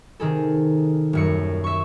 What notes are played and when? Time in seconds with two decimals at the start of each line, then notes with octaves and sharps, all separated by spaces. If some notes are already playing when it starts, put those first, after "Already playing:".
0.20 C3 D#3 G#4 A4
1.13 D#1 F#2 C#7
1.64 E5 C#6